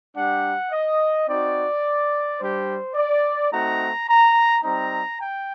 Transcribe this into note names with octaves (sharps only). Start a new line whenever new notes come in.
G3 D4 G4 F#5
D#5
C4 D#4 F#4 D5
G3 D4 G4 C5
D5
A3 C4 D#4 F#4 A#5
A#5
G3 C4 D#4 A#5
G5